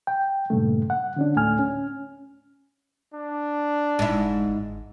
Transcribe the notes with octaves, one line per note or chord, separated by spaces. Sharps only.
G5
G2 A#2 C#3 A3
F#5
D3 C#4 D4
D2 A2 A3 G#5 F6
C#4
D4
F1 G#2 E4
G1